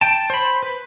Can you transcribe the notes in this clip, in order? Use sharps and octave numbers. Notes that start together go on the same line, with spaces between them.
G5 A5
C5 B5
B4